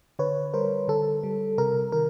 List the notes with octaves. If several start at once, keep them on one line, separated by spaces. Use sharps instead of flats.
D3 B4 C#5
G3 A#4 C5
D3 A4
G3
C3 A#4
D#3 A#4